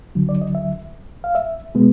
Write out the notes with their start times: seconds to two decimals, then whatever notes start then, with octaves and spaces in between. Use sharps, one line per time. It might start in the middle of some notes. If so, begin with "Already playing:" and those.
0.15 D2 D3 F#3
0.29 D5
0.42 D#5
0.55 E5
1.24 F5
1.35 E5
1.75 B2 G#3 B3